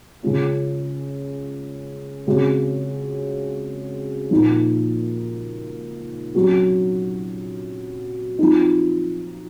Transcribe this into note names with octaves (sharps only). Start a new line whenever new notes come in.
C#3 G#3 C#4 F4
C#3 G#3 C4 F#4
A#2 F3 A#3 D#4
C3 F#3 C#4 F#4
F3 C4 D#4